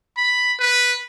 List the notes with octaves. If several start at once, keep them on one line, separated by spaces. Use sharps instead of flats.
B5
B4